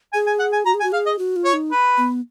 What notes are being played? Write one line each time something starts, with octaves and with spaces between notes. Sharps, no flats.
G#4 G#5
G#5
F#5
G#5
F#4 A#5
G#4
G#5
F#4
G#4 F5
D#5
F#4
F4
C#5
D#4
B4
B3